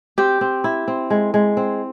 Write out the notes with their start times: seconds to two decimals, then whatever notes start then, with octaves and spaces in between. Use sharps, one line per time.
0.18 C4 G4
0.41 C4
0.64 E4
0.88 C4
1.10 G#3
1.34 G#3
1.57 C4